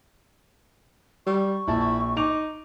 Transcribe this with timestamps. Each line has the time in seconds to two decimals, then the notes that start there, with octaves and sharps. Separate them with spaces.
1.27 G3 C#6
1.67 A#1 E4 A5
2.17 D#4 D6 F7